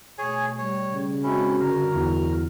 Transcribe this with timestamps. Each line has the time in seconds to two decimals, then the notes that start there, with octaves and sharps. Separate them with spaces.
0.18 B2 A3 G#4 C#5 G#5
0.58 G3 C#5
0.94 C#3
1.23 G#3 C4 C#4 E4 F#4
1.60 G2 D3 A#4 A#5
1.94 E2